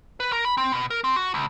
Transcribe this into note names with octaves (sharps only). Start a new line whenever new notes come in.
B4
A#4
B5
C4
B2
A#4
C4
F#4
C#2